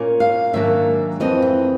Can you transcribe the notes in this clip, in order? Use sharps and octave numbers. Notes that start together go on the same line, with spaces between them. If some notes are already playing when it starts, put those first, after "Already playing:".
Already playing: A#2 A#3 C#4
F5
G#2 D#3 F#3 A#3 D4 E5
F2 C#3 E3 C4 D#5
E5